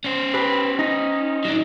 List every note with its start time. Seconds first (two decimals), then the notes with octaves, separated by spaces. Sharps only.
0.04 C#4 C5
0.34 G4 B4
0.79 D#4
1.45 F#3 D4